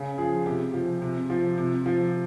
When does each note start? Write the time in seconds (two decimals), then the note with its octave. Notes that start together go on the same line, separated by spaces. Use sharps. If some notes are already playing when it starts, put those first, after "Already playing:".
Already playing: C#3
0.18 F3 G#4
0.46 C3 G4
0.74 F3
1.02 C3
1.30 F3
1.58 C3
1.86 F3